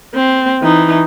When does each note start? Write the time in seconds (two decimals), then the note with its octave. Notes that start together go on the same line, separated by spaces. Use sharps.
0.14 C4
0.62 E3 D#4